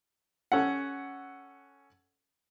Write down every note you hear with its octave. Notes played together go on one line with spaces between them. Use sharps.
C#4 A4 F#5